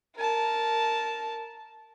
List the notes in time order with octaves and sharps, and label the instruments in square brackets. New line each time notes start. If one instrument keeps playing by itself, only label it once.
[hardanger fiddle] A#4 A5